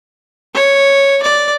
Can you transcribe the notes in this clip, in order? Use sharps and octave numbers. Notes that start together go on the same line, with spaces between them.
C#5
D5